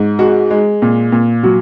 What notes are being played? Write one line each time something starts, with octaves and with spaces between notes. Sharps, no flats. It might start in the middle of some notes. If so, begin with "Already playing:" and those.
Already playing: G#2
G#3 F#4
G#3
A#2
A#2
F#3 F#4